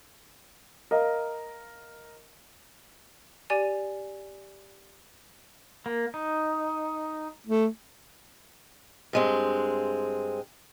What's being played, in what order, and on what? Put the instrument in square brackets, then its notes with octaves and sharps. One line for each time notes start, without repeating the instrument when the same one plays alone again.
[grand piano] A#4 D#5 F5
[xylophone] G4 D5 G#5 D#7
[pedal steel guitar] A#3
D#4
[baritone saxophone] A3
[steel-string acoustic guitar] G2 G#3 C4